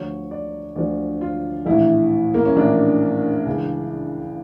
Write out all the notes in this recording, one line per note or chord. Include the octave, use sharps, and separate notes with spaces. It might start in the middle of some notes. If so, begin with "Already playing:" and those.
Already playing: D2 D3 F3 C#5
D5
D2 D3 F3 D5
F4
A#1 A2 E3 E4
A#3
C#4
A#1 A2 E3 D4
C#2 C#3 E3